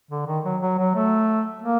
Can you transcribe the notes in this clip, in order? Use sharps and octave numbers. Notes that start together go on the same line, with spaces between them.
D3
D#3
F#3
F#3
F#3
A3
A#3